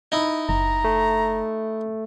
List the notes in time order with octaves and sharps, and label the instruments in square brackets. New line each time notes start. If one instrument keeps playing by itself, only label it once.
[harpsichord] D#4 E4
[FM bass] F#1 [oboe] A#5
[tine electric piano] A3